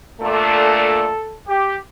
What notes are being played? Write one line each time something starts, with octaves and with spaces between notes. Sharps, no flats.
A#2 A3 D4 A4
G4